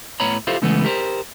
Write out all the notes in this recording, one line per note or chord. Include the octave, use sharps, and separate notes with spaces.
A2 B3 C#5 A#5 B5
E4 F4 G4 A4 C5 F5
C#3 E3 G#3 A3 B3
G4 A#4 C5